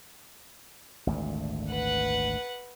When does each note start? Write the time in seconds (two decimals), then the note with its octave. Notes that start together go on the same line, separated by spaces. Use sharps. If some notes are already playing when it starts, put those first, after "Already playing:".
1.07 G#1 D2 A#2
1.70 B4 F#5